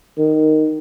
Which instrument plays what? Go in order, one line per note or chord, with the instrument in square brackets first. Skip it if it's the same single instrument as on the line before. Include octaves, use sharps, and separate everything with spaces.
[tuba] D#3